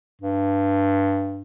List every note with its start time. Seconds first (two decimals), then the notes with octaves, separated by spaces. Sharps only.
0.21 G2